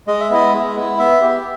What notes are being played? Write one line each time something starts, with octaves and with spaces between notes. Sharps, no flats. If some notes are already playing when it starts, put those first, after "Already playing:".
G#3 D#5
E5
B3 E4 D#5
G#3
B3 E4
B3 E5
G4